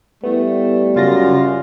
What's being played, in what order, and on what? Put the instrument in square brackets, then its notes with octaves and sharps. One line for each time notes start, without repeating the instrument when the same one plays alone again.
[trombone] G3 [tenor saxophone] A3 [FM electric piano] B3 E4
[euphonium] F#2 [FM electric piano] C#3 A6 A#6 [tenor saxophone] F4